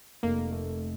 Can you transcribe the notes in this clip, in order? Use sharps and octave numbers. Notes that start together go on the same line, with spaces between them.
F1 A#3
A3